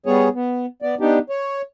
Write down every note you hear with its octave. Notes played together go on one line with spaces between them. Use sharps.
G3 B3 G#4 C#5
B3
B3 D5
B3 D4 D#4 G4
C#5